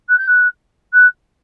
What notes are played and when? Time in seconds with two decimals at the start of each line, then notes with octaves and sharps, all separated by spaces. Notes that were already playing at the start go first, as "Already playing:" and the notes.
0.09 F#6
0.18 G6
0.27 F#6
0.93 F#6